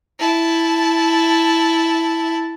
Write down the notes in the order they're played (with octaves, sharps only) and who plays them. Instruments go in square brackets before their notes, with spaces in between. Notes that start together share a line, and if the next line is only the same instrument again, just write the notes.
[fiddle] E4 A5